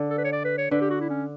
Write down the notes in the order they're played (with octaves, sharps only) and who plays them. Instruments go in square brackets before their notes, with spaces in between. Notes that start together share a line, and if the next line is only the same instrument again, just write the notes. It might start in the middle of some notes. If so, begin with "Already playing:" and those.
Already playing: [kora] D3
[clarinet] A4
B4
C#5
D5
B4
C#5
[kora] D3 [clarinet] B4
[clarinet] G4
F#4
E4
C#4